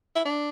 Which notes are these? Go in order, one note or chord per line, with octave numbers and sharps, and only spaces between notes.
E4
D4